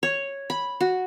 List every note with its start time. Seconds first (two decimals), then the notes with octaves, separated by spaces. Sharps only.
0.03 C#5
0.50 B5
0.81 F#4